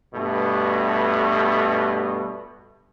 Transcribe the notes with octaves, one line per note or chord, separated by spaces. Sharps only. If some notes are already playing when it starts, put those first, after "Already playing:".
G2 B2 A3